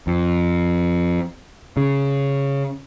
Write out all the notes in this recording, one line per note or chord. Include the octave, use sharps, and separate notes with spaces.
F2
C#3